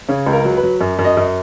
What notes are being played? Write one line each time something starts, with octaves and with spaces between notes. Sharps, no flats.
C#3 C#5
C#2
A#4
F#3
B4
F#3
F#2
F#2
D#5
F#2